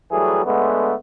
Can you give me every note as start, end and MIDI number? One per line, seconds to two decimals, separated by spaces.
0.11 0.44 52
0.11 0.44 54
0.11 0.44 55
0.11 0.44 57
0.11 0.44 68
0.46 0.94 50
0.46 0.94 56
0.46 0.94 57
0.46 0.94 59